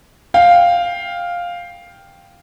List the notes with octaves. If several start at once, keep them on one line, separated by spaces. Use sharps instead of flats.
F5 G5